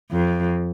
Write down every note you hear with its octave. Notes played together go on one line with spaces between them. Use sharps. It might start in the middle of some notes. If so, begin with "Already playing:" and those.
F2